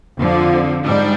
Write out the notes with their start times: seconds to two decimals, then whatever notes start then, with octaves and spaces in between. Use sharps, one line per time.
0.19 F2 D3 F3
0.83 G#2 G3 D4